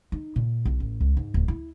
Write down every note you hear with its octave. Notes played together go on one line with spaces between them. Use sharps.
D#4
A#2
B1
A1
C#2
G#2
D1
E4